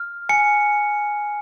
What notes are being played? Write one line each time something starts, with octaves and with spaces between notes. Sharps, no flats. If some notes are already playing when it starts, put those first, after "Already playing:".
Already playing: F6
G#5 C#7